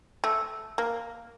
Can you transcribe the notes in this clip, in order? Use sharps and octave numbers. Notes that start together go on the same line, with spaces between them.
A3
A#3